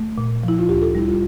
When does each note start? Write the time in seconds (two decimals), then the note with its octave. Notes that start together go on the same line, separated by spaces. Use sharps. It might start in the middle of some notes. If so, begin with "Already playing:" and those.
Already playing: A3
0.18 A#2
0.43 F3 E4
0.59 F4
0.69 D2 G4
0.82 A4
0.95 G3 E4
1.07 F4